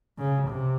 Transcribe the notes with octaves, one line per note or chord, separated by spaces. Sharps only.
C#3
C3